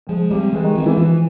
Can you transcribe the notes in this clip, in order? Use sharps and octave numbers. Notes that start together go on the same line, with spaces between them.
F3 G#3
G3 G#3 C4
E3 G#3
D#3
F3 G#3 C4
E3
E3 F3